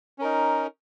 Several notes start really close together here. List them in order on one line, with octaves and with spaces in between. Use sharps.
C#4 A#4 D#4